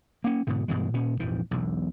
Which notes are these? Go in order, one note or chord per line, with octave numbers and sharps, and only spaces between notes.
A#3 C#4
G#2 B2 D3
G2 B2 E3 G#3
A#2 C#4
A#1 F2 G#2 E3
E1 B1